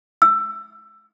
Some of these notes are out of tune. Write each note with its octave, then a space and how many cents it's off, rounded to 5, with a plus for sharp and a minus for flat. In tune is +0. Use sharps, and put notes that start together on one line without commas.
E6 +20